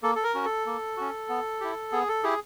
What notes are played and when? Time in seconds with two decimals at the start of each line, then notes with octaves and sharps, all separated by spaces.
0.03 A#3 A4
0.15 A4
0.23 A#4
0.35 C#4 F#4
0.45 A4
0.66 A#3
0.97 C#4 F#4
1.29 B3
1.60 E4 G4
1.92 B3 G#4
2.08 A4
2.23 E4 G4 G#4